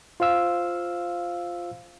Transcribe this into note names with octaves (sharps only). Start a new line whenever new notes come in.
F4 C5 F5 E6